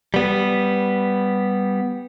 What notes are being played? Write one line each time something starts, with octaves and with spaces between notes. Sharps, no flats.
G3 B3